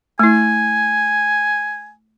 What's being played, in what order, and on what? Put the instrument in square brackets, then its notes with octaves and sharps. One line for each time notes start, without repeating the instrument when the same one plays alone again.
[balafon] A3 E4 [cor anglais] G#5